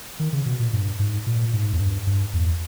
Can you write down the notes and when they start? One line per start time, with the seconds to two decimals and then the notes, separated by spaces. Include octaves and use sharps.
0.19 D#3
0.33 C#3
0.46 B2
0.60 A#2
0.73 G2
0.99 G#2
1.27 A#2
1.53 G#2
1.72 E2
1.80 G2
2.07 G2
2.33 E2